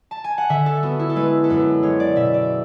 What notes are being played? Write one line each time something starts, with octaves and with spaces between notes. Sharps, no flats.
A5
G#5
F#5
D3 E5
A4
B3 F#4
E4
A4
G#3 B4
A4
F#2 B4
G#3 C#5
D5
B2 E5
D5